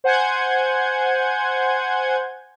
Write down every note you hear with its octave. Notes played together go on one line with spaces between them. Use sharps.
C5 F#5 G#5 G6 G#6